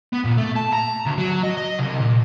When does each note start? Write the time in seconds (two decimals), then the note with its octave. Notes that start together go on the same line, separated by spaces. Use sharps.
0.13 B3
0.25 A#2
0.38 A3
0.56 A5
0.73 A#5
1.07 D2
1.18 F#3
1.43 D#5
1.57 D#5
1.79 C2
2.01 A#2